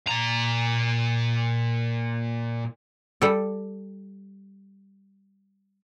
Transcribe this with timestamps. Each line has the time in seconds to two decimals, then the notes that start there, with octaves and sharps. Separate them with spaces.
0.07 A#2 A#5
3.22 G3 A4